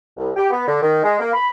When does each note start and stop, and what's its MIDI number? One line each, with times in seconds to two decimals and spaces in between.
0.17 0.30 36
0.36 0.47 67
0.51 0.62 59
0.67 0.80 50
0.81 1.02 51
1.04 1.18 56
1.19 1.31 58
1.33 1.50 83